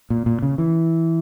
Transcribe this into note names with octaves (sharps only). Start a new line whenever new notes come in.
A#2
A#2
C#3
E3